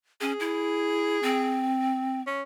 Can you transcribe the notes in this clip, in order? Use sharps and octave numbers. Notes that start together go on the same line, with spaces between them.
C#4 G#4
E4
C4
C#4